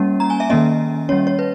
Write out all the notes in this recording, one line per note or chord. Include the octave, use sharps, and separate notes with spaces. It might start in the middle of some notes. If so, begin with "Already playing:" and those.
Already playing: G3 A#3 C#4
A#5
G#5
E5
D#3 A#3 C#4 D#5
G3 C#4 C#5
C#5
B4